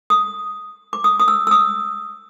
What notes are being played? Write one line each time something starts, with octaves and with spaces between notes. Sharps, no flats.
D#6
D6
D#6
D#6
E6
E6
D#6